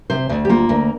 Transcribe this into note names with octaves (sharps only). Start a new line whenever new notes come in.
C3 C5
D2
G4
A#3 F4
D2 A#4